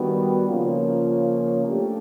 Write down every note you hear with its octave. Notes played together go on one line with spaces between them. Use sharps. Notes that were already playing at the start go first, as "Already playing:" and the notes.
Already playing: D#3 G3 B3 D4 F#4
C#3 F3 A#3 C#4 F4
A3 D4 G4